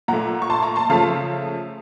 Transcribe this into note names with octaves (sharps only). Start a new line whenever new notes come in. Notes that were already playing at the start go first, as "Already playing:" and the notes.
A#2 A3 F#5 A#5
C#6
A5 C6
A#5 C#6
A5 C6
C#3 F3 A3 F5 A5